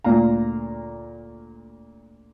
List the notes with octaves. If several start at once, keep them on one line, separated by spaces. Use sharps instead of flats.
D2 A#2 F5 A#5